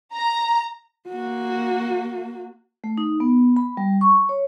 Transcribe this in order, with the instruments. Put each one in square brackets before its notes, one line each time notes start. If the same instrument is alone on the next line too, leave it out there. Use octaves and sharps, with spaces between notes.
[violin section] A#5
[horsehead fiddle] A#3 F#4
[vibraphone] A3
D#4
B3
B5
G3
C#6
C#5